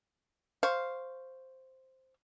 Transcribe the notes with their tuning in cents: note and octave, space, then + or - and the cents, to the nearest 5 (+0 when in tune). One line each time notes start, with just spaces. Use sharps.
C5 +0 F5 +0 C#6 +0